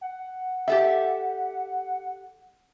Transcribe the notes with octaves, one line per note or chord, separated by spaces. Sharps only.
F#5
G4 A4 E5